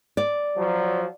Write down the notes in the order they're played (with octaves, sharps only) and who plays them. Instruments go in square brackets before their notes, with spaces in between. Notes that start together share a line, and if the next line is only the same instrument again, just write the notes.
[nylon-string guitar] D5
[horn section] F3 F#3